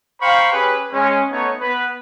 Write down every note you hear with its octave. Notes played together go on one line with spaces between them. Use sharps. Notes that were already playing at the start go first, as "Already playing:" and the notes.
C5 F5 G5 A#5 B5 C#6
C#4 G4 G#4 B4
G#3 C#4
A3 B3 D#4 C#5
B3 B4